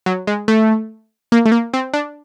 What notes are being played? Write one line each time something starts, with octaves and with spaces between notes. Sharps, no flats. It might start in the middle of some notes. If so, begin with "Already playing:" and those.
F#3
G#3
A3
A#3
A3
A#3
C4
D4